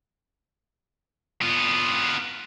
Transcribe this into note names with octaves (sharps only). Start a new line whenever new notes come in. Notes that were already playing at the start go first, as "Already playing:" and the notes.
B3 F4